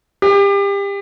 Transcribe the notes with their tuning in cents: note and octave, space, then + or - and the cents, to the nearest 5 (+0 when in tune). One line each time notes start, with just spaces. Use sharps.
G4 +30